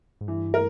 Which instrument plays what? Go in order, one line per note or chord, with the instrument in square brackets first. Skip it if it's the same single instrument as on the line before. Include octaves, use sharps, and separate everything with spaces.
[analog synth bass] G#2
[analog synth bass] G2 [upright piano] E3
[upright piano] A#4